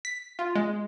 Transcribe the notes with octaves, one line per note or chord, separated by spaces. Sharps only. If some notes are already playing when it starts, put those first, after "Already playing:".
B6
F4
G#3